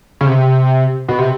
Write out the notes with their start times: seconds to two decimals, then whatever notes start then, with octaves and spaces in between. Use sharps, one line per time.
0.21 C#3
0.26 C3
1.08 B2
1.19 C3